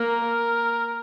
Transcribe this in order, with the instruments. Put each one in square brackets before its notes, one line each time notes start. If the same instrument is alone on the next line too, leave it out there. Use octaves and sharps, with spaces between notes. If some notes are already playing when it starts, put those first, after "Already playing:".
Already playing: [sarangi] A#3 [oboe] A#4